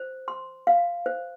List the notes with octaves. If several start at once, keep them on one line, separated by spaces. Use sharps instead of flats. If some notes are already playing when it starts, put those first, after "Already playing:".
Already playing: C5
C6
F5
C5